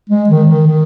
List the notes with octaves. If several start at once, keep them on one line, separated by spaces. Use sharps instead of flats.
G#3
D#3
D#3
D#3